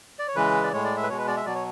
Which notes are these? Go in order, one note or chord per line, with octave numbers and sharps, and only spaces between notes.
D5
C#5
C#3 E3 G#3 B4
D5
A2 G#3 C#5
D5
E5
B4
B2 G#3 C#5
B4
D5
E5
B2 F#3 D5
C#5